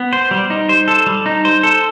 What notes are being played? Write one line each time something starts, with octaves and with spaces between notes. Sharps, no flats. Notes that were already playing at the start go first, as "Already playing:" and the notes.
Already playing: B3
C5
G3
D#4
C5
A4
G3
D#4
C5
A4